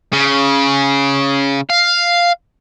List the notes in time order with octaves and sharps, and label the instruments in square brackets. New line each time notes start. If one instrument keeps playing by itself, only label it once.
[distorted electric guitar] C#3
F5